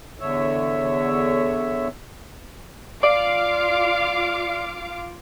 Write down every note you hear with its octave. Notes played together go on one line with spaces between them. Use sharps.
E2 D3 C#5 E5
F4 D5 F5 D6